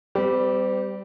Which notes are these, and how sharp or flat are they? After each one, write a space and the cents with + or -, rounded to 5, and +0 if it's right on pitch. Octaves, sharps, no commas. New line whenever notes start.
G3 +0 C4 -40 G4 -15